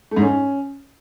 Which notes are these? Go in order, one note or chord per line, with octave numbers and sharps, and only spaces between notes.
A3
G#2
C#4